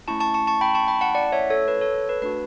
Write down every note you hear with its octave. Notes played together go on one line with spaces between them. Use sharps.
A3 C#4 E4 A5 C#6
A5 C#6
A5 C#6
A5 C#6
G5 B5
A5 C#6
G5 B5
F#5 A5
D5 F#5
C#5 E5
A4 C#5
B4
A4 C#5
A4
B4
A3 D4 F#4 B4